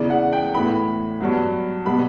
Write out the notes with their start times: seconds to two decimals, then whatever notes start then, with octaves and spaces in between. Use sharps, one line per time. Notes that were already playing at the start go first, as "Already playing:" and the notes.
Already playing: E2 C#3 E3 D5
0.10 F#5
0.33 G5
0.54 A2 E3 B3 B5
1.20 G2 F#3 B3
1.85 B2 G3 B3 B5